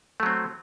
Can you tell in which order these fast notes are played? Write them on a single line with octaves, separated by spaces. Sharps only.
A3 F#3 C4